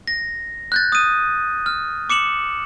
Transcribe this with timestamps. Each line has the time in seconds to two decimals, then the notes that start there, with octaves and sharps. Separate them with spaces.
0.08 A#6
0.72 F#6 G6 A6
0.92 D#6 D#7
1.66 F6
2.10 D6 C#7 E7 F#7